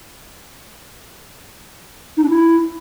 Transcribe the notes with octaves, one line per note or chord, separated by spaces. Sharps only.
D#4
D4
E4